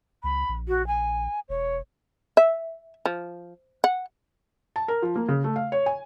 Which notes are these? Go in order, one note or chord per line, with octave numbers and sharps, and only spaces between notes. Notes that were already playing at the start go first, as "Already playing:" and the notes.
C#2 B5
A#1
F#4
G#5
E1 C#5
E5
F3
F#5
A5
A#4
F3
A#3
C#3
A3
F5
C#5
G#5